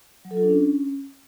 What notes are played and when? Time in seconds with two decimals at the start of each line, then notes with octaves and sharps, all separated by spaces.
0.25 F#3
0.31 A4
0.37 F4
0.43 D4
0.49 C#4